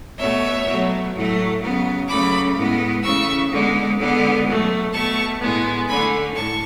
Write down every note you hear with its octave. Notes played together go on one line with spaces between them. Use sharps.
B2 A3 C#5 E5
B2 F#3 A3
A2 F#3 A3
C#3 F#3 B3
C#3 F#3 A3 B5 D6
A2 G#3 B3
C#3 E3 A3 C#6 E6
D3 G#3 B3
D3 G#3 B3
B2 F#3 A3
B2 A3 A5 C#6
A2 G#3 B3
D3 A3 G#5 B5
A2 A5 C#6